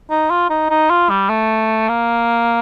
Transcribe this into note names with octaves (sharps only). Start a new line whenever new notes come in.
D#4
F4
D#4
D#4
F4
G3
A3
A#3